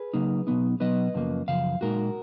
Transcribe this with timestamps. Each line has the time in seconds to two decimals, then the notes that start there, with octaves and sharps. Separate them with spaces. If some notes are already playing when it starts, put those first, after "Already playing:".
Already playing: G#4 B4
0.14 C#3 F#3 A#3 D#4
0.47 B2 F#3 B3 D#4
0.80 B2 F#3 B3 D#4 B4 D#5
1.14 F#2 C#3 F3 A#3
1.48 F#2 C#3 F3 F5
1.81 A#2 G#3 D#4 F#4 A#4